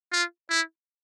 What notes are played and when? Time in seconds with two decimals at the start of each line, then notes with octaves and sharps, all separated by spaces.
0.12 F4
0.49 E4